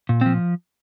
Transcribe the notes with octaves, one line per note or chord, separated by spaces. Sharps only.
A#2
F3 C4